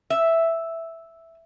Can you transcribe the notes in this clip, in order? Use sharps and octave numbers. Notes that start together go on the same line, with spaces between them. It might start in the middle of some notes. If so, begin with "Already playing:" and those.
E5